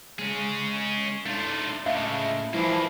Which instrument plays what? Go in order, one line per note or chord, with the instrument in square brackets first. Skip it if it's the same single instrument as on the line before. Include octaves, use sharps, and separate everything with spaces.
[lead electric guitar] G#3 G#5 [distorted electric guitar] C#4 G#4
[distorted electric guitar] A3 F4 [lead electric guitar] D4 D#4
[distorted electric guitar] C#2 C#3 [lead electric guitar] A2 [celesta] E5 F5
[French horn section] E3 F3 E4 [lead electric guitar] G3 [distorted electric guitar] A#3 D4